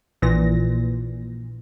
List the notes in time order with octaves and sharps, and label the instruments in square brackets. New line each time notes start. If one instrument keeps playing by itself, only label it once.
[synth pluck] A#1 A#2 E3 A#6